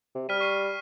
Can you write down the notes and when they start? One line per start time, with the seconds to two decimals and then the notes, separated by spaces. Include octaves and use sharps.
0.15 C3
0.29 G3 F6 B6 D#7
0.41 C#6 C7 D#7